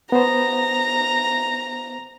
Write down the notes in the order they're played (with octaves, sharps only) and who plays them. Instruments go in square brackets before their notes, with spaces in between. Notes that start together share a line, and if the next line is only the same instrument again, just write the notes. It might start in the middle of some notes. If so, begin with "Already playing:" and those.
[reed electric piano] B3 C5 [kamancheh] A#5